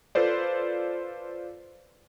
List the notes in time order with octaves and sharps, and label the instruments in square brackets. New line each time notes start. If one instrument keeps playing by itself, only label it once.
[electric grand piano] F4 A4 B4 C5 D5